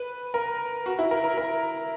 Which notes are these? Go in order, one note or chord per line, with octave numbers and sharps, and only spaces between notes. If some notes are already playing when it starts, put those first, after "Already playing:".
Already playing: B4
A#4
F#4
E4
A#4
A#4
A#4